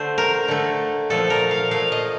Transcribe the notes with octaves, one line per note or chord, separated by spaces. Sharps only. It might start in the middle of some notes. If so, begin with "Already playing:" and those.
Already playing: D3 A3 C5
A#4
D3 A3
A#2 F3 A3 A4
A#4
F5
A#2 F3 A3 F5
D#5